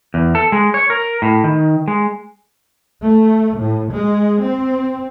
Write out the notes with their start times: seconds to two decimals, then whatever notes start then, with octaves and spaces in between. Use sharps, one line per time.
0.14 E2
0.35 A4
0.52 G#3
0.74 C#5
0.90 A#4
1.22 A2
1.44 D#3
1.88 G#3
3.03 A3
3.58 A2
3.92 G#3
4.44 C4